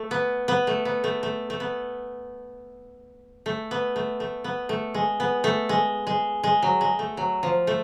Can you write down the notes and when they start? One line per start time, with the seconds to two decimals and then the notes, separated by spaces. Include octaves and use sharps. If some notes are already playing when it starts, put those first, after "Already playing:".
Already playing: A3
0.11 B3
0.48 B3
0.67 A3
0.85 B3
1.04 A3
1.23 A3
1.50 A3
1.60 B3
3.46 A3
3.71 B3
3.96 A3
4.20 A3
4.44 B3
4.69 A3
4.94 G#3
5.20 B3
5.44 A3
5.69 G#3
6.07 G#3
6.44 G#3
6.62 F#3
6.81 G#3
6.99 A3
7.17 F#3
7.43 F3
7.67 A3